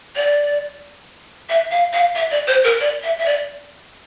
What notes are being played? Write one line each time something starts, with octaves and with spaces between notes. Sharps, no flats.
D5
E5
F5
F5
E5
D5
C5
A#4
D5
E5
E5
D5